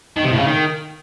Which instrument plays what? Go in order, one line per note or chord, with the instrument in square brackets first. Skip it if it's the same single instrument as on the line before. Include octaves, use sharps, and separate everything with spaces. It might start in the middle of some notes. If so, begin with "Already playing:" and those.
[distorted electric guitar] D#3
C3
A2
C#3
D#3